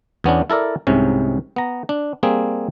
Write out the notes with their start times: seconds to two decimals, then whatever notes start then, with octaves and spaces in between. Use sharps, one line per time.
0.24 E2 B3 C#4 D4
0.50 E4 A4 A#4 D5
0.87 C2 G#2 C3 C#4
1.56 B3 A#5
1.89 D4
2.23 G3 A#3 C4 G#4